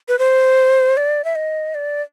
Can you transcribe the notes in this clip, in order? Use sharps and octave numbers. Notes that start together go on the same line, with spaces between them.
B4
C5
D5
E5
D#5
D5